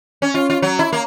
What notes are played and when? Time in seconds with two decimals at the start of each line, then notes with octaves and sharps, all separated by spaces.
0.22 C#4
0.34 F4
0.50 F4
0.62 F#3
0.79 E4
0.93 A#3